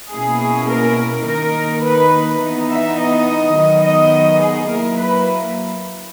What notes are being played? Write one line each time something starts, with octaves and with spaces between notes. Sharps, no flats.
B2 A#3 C#4 E4 G#4
A#4
D#3 A#3 D#4 A#4
B4
E3 B3 D#4
E5
D#5
D#3 F#3 B3 D#4
D#5
G#4
F#3 A#3 E4 A#4
B4